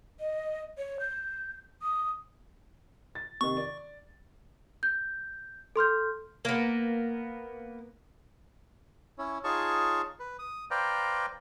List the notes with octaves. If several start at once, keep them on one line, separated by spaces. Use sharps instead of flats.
D#5
C#5
G6
D#6
A6
C3 D#3 C#6
D5
G6
A4 C6 F6 G6
A#3 B3
C#4 E4 C#5
D#4 F4 G#4 C#5 A5 C#6
B4
D#6
B4 C5 D5 F5 G5 A#5